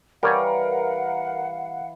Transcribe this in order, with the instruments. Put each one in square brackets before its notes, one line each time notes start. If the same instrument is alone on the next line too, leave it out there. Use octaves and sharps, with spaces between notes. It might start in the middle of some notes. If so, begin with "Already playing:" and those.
[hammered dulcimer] E3 [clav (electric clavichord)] G3 C#5 G#5 [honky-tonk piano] A#4 [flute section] F5 F#5